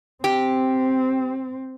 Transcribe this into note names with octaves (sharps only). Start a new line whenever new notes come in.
C4 G4